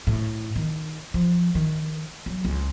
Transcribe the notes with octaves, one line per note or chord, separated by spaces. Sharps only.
A2
D#3
F3
D#3
F#3
C#2